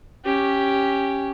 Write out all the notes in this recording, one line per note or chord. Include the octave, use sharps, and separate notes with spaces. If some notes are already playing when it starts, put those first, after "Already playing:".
C#4 G4